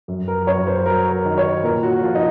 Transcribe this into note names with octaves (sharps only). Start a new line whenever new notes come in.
F#2
A#4
F#2 C#5
C5
F#3 A#4
A#4
D#3
C#5
A#2 A#4
F#4
F3 F4
D#4